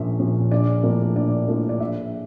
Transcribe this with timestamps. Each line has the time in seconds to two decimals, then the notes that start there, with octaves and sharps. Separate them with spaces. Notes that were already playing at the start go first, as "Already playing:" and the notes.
Already playing: A#1 A#2 F3 C#4 E5
0.19 A#2 F3 C#4
0.51 A#1 D5
0.83 A2 F3 A#3 D4
1.16 A#1 D5
1.48 A2 F3 A#3 D4
1.69 D5
1.80 A#1 E5